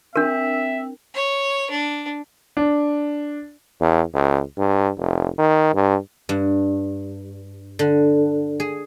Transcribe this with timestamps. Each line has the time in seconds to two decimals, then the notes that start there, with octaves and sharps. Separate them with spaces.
0.16 C4 D4 A#4 E5
1.14 C#5
1.70 D4
2.57 D4
3.81 E2
4.14 C#2
4.58 G2
4.97 F1
5.38 D#3
5.74 G2
6.29 G2
7.79 D3
8.60 G#4